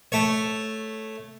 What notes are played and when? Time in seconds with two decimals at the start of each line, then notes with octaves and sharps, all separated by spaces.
0.12 A3 C#5